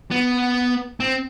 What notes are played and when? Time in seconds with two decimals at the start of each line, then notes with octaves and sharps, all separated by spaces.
0.11 B3
1.00 C4